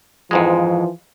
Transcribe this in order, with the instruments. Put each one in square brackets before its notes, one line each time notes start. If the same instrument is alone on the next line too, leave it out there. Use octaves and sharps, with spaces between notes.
[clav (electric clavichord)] F2 G#2 G#3 [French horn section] E3 F3